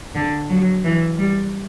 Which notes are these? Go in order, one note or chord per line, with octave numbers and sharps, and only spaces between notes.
D3
F#3
E3
G3